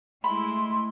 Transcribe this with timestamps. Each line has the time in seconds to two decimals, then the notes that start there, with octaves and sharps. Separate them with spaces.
0.24 G#3 A3 E4 B5 C6